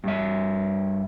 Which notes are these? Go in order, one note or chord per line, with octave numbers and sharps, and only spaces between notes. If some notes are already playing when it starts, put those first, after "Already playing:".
G2 E5